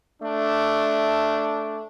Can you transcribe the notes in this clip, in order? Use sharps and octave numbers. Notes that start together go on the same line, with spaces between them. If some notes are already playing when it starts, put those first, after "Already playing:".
A3 D4